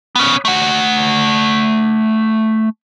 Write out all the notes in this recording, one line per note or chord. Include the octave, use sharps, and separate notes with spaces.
B3 C#4
A3 F#5